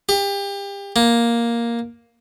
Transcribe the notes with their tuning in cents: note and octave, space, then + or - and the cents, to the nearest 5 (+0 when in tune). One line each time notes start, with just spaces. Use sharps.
G4 +30
A#3 +5